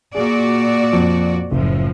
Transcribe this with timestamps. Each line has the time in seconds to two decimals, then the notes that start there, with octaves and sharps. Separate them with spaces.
0.15 A#2 F#4 G#4 D5
0.93 F2
1.51 F#1 A2 F3